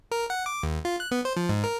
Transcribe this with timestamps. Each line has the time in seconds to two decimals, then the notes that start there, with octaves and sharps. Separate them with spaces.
0.11 A#4
0.30 F#5
0.46 D6
0.63 D#2
0.85 F4
1.00 F#6
1.11 B3
1.25 C5
1.37 F3
1.49 G#2
1.64 A#4